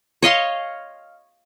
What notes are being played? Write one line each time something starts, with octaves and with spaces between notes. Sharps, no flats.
C#5 D#5 F5 C6